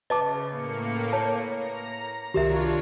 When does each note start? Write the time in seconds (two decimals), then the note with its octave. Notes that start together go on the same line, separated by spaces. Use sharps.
0.10 C#3 B4 D#5 A5 D6
0.49 A2 A#3 C#7
1.13 C#5 A5
1.50 A#5
2.34 C2 D#3 D4 F4 G4 A#4 C#5 E5